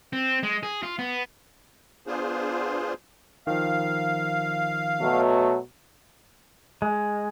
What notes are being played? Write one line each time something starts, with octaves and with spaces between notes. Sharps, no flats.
C4
G#3
G#4
F4
B3
B3 D4 F4 G#4 C5
D#3 F3 F5
B2 F#3 A3
G#3